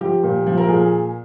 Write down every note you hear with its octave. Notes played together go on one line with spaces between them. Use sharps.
F3 G4
A#2
F3
A#4
A#2 G#4